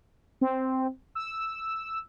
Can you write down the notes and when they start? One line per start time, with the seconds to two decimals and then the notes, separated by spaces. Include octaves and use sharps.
0.41 C4
1.15 E6